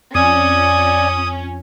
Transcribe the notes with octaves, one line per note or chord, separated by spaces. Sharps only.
F2 C#4 D5 G#5 D#6